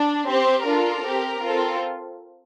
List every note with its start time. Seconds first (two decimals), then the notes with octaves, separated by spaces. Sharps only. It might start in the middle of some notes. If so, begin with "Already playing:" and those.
Already playing: D4
0.27 C4 G4 C5
0.64 D4 F4 A4 A#4
1.03 C4 G4
1.40 C4 F4 A4